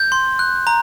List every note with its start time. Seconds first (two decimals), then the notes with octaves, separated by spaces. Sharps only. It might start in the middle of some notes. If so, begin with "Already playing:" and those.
Already playing: G6
0.12 C6
0.39 F#6
0.67 A#5